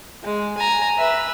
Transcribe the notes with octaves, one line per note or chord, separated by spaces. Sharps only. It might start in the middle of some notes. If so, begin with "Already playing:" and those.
G#3
G#5 A#5
B4 E5